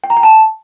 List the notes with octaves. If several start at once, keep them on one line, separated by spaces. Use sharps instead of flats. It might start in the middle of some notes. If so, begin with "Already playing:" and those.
G5
A#5
G5
A5